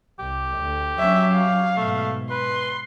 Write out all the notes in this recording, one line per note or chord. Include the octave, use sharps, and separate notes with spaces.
C2 G4
D2
F#3 C#4 E5
F5
G#2 B2 A3
B4 C6